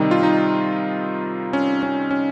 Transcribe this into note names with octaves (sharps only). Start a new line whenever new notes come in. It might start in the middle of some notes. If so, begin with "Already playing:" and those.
Already playing: C3 D#3 G3 D#4
F4
D#4
C#4
C#4
C#4